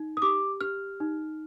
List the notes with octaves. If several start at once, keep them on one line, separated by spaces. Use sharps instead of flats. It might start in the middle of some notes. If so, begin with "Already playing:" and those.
Already playing: D#4
D#6
G4 D6
G4 F6
D#4